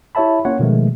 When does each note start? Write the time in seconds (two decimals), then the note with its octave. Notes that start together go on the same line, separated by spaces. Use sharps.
0.15 E4 G4 C#5 E5 A5 B5
0.45 A#3 C#4 F4 C#5 F#5
0.59 B2 D#3 F3 G#3 A3